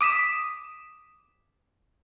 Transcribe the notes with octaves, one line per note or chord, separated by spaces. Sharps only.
D6 D#6 B6 E7